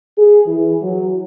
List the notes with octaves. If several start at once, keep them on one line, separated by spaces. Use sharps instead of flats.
G#4
E3
F#3